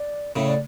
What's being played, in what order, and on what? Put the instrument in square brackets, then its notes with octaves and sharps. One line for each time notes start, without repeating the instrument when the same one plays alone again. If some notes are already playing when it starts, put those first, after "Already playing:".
Already playing: [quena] D5
[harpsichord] A2 C#3 [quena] E5
[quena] D5